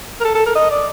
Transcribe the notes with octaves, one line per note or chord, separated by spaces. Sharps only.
A#4
A4
A4
A#4
D#5
D5